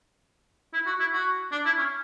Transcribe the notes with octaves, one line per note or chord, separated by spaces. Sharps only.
E4
F#4
E4
F#4
D4
E4
C#4